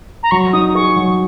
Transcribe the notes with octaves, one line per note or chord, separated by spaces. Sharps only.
A#5
F#3 C#6
D#4 D#6
G#4 C#6
F#3